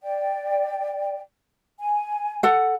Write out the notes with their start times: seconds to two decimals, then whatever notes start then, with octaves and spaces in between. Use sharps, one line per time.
0.02 D5 G5
1.79 G#5
2.43 A4 F#5